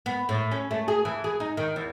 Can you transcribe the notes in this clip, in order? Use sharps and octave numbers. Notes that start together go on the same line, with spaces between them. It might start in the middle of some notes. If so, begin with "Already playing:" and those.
B3
A2
C#4
A3
G#4
E3
G#4
D#4
D#3
E2